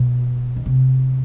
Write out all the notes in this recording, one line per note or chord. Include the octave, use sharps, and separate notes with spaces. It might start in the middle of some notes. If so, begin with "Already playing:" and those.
Already playing: B2
D#3
C3